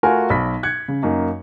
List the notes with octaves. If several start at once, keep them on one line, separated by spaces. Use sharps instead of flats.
A3 F4 F#4 A#4 G#5
B1 B5 B6
F#6 G#6 C#7
C#3
F#2 A#3 D#4